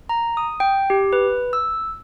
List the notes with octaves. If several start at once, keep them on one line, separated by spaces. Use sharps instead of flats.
A#5
D#6
G5
G4
B4
E6